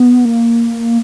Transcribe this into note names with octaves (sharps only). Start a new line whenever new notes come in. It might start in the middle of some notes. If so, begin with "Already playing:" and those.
Already playing: B3
A#3